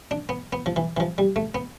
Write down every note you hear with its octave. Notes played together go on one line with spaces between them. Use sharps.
D4
B3
B3
F3
E3
E3
F3
G3
A3
B3